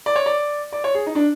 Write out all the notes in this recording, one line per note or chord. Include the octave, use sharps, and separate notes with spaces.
D5
C#5
D5
D5
C#5
G#4
D#4
D4